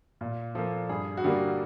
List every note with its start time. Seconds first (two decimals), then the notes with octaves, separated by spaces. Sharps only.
0.21 A#2
0.55 F3 A#3 A4
0.89 G2 G#4
1.17 F#4
1.24 D3 G3 A#3 G4